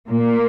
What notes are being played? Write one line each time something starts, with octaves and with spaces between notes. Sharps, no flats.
A#2 A#3